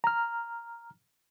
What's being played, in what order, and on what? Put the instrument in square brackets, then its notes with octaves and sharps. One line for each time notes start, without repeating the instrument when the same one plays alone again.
[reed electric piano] A#5 F6